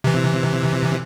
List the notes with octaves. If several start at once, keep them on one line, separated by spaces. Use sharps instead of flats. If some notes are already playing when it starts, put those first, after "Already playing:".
C3 E3